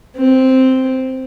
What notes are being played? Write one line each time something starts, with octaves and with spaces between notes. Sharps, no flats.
C4